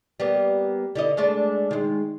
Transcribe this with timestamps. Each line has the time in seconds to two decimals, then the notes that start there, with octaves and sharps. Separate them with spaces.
0.20 G3 A#3 B3
0.95 D3 E4 D#5
1.17 G#3 A3 D4
1.71 D#3 G#3